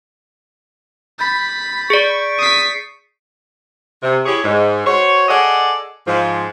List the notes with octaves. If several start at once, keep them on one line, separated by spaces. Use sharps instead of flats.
B5 G6 A6 B6
G#4 D5 C#6 A6 C#7 D7
D#6 B6 C7 D#7
C3
E4 G4 G#4 C#5
G#2
F#4 C5 C#5
G#4 A4 D5 D#5 F#5
G#2 F3